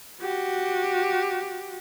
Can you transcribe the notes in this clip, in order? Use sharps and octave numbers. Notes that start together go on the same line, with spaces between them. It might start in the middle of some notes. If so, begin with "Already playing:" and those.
F#4 G4